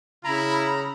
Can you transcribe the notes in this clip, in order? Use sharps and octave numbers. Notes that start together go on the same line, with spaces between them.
C#3 E4 A#5 B5